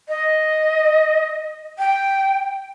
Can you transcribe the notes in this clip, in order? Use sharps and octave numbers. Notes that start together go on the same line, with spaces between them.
D#5
G5